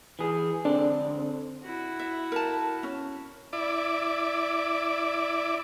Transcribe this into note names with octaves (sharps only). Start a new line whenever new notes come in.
E3 G#4
D3 C4 D4
E4 F#4
E5
A#4 A5
C#4
E4 D5